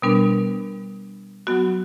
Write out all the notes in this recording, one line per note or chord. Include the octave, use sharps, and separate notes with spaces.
B2 G3 B3 D4 A#4
F#3 B3 F#4